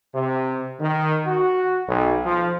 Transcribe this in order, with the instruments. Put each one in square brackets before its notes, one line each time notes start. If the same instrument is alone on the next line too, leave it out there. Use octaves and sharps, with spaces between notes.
[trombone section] C3
D#3
F#4
B1
F3